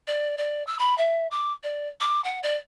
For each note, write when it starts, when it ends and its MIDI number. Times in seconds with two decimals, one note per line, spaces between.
0.07 0.36 74
0.38 0.65 74
0.67 0.78 88
0.79 0.97 83
0.98 1.27 76
1.31 1.52 86
1.63 1.88 74
2.00 2.23 86
2.24 2.39 78
2.43 2.57 74